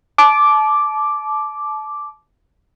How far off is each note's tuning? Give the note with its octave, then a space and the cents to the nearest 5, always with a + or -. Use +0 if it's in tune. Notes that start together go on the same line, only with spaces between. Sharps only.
A5 -30 D6 +0